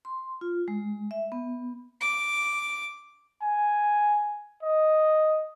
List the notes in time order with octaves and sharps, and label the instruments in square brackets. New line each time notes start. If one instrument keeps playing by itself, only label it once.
[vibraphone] C6
F4
G#3
E5
B3
[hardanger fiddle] D6
[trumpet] G#5
D#5